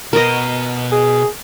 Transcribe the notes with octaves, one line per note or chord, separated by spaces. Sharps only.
B2 B3 A#4 D#5
G#4